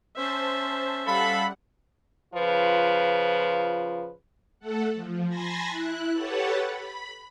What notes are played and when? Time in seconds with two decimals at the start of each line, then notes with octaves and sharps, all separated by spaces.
0.16 C#4 C5 E5 A5
1.07 G3 A4 F5 F#5 B5
2.34 C#3 F3 F4 B4
4.60 A3 A4 F#5
4.94 F3
5.28 G#5 A5 B5 C6 G#6 A#6
5.68 E4 F#6
6.12 G4 A4 B4 C#5 F#5 A5
6.65 B5